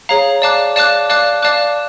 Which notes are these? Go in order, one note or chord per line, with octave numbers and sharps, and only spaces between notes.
G#4 C#5 F5 A#5
D5 F5 A5 D6 F#6
D5 F5 A5 D6 F#6
D5 F5 A5 D6 F#6
D5 F5 A5 D6 F#6